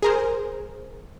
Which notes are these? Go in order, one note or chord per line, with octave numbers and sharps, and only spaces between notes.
G#4 A#4 C5